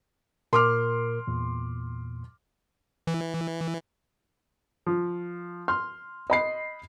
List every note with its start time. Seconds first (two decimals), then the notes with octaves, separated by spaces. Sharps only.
0.53 A#2 A#4 C6 D6 F6
1.27 E2 A#2
3.07 E3
4.86 F3
5.68 C6 F6
6.30 D#5 B5 C7